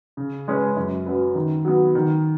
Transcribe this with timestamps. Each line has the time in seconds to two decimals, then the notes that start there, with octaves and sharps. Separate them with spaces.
0.17 C#3
0.48 G#3 C#4 G#4 B4
0.76 F#2
1.06 F#3 C#4 B4
1.35 D#3
1.65 F#3 B3
1.95 D#3